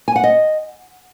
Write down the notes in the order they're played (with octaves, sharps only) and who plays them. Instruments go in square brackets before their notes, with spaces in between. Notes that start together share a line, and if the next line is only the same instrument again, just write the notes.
[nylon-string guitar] G#5
F#5
D#5